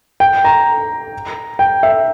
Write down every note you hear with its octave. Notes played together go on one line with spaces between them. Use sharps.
G5
A#5
G5
E5